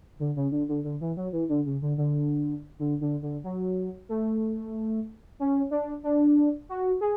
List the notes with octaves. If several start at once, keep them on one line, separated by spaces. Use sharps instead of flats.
D3
C#3
D3
D3
D3
E3
F#3
E3
D3
C#3
D3
D3
D3
D3
D3
F#3
A3
C#4
D4
D4
F#4
G#4